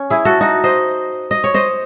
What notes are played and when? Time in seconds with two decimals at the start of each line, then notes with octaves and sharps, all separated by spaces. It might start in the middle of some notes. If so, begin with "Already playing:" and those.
Already playing: C#4
0.10 E4 G#4
0.25 F#4 A4
0.41 D#4 F#4
0.64 C5 D#5
1.31 D#5
1.44 C#5
1.54 C5 D#5